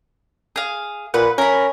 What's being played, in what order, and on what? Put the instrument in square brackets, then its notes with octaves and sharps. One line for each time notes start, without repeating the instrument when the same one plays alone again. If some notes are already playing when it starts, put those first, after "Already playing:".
[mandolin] G#4 F5
[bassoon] A#2 [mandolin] B4 F#5
[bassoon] C#4 [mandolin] A#4 B5